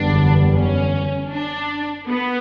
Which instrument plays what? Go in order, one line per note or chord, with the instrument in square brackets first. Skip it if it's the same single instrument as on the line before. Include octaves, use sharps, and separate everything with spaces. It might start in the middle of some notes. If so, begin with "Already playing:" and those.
Already playing: [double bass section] F#1 E2 D3 G3 B3 [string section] D4
[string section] C#4
D4
B3